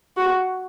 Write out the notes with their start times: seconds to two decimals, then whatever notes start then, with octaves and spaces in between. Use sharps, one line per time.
0.17 F#4